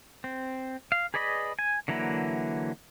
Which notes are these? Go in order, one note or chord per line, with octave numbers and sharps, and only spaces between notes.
C4
F5
G#4 B4 D5 D#5 B5
G#5
D3 E3 F#3 A#3 E4